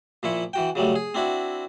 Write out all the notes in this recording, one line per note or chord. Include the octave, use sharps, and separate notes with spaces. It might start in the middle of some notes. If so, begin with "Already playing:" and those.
A#2 F3 E4 C#6
E3 F#4 G5
C#3 F#3 G3 A3
G#4
C4 D4 E4 F#4